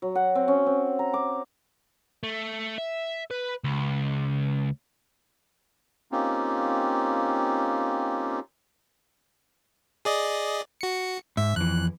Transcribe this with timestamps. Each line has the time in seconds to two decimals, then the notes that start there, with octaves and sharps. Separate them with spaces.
0.02 F#3
0.15 F#5
0.35 C4
0.48 C#4
0.66 C4
0.99 A#5
1.14 D6
2.23 A3
2.78 E5
3.31 B4
3.64 C#2
6.12 A#3 C4 C#4 D#4 F4 G4
10.05 G#4 D5 D#5
10.81 F#4 C#7
11.37 G#2 E5
11.56 F2 E3 F#6